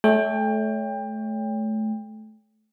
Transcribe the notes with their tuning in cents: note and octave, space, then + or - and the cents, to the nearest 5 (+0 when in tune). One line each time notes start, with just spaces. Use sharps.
A3 -25 C#5 +25 G5 +25